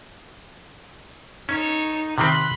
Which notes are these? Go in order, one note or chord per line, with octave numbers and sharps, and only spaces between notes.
C#4 D#4 A4 C#5
C3 D#3 C4 B5 C6 F#6